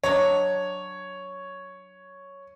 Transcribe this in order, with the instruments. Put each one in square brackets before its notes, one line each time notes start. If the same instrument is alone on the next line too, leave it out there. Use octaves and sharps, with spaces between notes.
[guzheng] F#3 D4 D#5 [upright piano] C#5